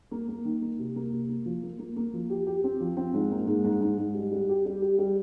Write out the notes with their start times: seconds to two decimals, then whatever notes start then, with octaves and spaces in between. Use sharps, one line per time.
0.11 A#3
0.28 A#3
0.45 D#3
0.62 A#3
0.78 C3
0.96 A#3
1.12 C3
1.29 A#3
1.46 F3
1.63 A#3
1.79 A#3
1.96 A#3
2.13 F3
2.30 G4
2.47 G4
2.64 C4
2.81 F3
2.97 C4
3.14 G#2
3.31 A#3
3.47 G#2
3.64 G#2
3.81 G#2
3.98 G#2
4.15 G3
4.32 G3
4.49 G4
4.66 G3
4.82 G4
4.99 G3